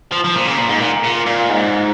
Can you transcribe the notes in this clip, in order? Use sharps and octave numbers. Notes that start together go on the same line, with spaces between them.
F3
F3
A#2
C#3
A#2
G#2
A#2
A#2
A#2
G#2